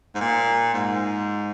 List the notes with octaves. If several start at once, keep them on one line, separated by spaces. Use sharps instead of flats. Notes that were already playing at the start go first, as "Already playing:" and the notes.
G#2
A#2
G#2